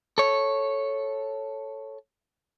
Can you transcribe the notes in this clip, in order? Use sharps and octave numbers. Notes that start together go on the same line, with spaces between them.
A4 C#5